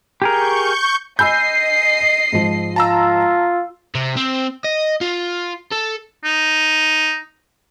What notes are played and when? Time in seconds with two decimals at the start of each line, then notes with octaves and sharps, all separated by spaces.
0.22 G4 G#4 A#4 C#6 G6
1.19 D#5 G#5 B5 E6 G6 C7
2.32 G#2 F3
2.76 F4 A5 A#5 E6
3.95 C3
4.16 C4
4.64 D#5
5.01 F4
5.72 A4
6.24 D#4